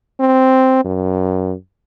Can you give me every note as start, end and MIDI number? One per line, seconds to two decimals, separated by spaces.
0.20 0.80 60
0.85 1.53 42